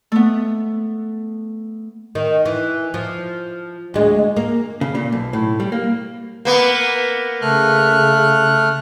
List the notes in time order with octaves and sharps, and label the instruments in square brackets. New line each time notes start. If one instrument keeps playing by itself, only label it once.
[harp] A3 B3
[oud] D#3
E3
F3
D2 G#3
A#3
[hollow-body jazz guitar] C#3
A#2
B1
A2
G3
A#3
[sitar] A#3 B3
[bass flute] C#3 [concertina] A3 F6 F#6